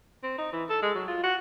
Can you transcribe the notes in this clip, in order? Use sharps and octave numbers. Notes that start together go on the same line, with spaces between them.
C4
D#4
E3
A4
G#3
F#3
F4
F#4